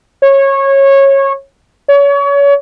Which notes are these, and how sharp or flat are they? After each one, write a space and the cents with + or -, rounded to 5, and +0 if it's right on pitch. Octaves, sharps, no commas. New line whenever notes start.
C#5 -20
C#5 +30